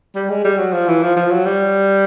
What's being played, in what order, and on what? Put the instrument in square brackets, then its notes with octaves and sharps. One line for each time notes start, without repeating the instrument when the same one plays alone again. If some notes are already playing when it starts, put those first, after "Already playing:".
[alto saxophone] G3
G#3
G3
F#3
F3
E3
F3
F3
F#3
G3